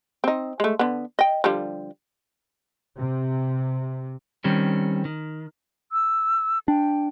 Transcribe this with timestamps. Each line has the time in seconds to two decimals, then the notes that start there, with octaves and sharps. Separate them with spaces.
0.24 C4 D#4
0.60 G#3 A3
0.79 D3 B3
1.19 D#5 G5
1.44 D3 F3 G3
2.97 C3
4.44 D#3 G3 C4 C#4
5.05 D#3
5.92 E6
6.68 D4 G5